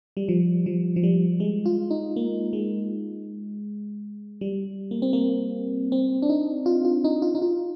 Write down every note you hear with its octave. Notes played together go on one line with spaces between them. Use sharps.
G3
F3
F3
F3
G3
G#3
F4
D#4
A#3
G#3
G3
A#3
C4
A#3
C4
D4
D#4
F4
F4
D#4
F4
D#4
F4